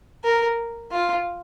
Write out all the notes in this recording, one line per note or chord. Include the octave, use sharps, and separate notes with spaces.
A#4
F4